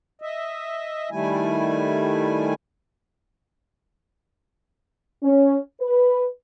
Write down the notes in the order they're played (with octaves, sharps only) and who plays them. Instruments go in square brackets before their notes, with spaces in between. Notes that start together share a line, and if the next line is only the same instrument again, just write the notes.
[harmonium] D#5 E5
D#3 G3 A3 E4 G#5
[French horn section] C#4
B4